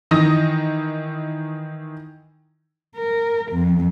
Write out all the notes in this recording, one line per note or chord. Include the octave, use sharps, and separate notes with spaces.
D#3 E3 D#4 D#6 A#6
A#4
F2